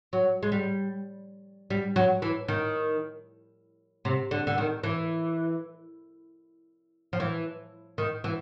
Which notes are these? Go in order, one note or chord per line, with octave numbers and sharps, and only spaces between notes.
F#3
G#3
G3
G3
F#3
E3
D#3
C3
D3
D3
D#3
E3
F3
E3
D#3
E3